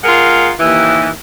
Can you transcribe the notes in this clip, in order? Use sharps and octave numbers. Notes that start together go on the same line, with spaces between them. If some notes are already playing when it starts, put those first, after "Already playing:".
G#3 F4 A#4 F#5
D#2 E3